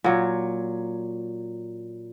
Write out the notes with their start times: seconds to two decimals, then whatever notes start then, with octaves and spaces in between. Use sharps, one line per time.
0.04 A#2 F#3